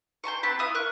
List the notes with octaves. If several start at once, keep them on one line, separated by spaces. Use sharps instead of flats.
G5 A5 C6 C#6
B3 C4 A5 B5
E4 F4 D#6
A#4 C#6 F#6